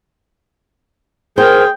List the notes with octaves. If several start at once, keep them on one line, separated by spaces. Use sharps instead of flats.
G#4 A#4 C5 G5